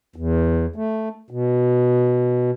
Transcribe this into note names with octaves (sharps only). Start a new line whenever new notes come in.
E2
A3
B2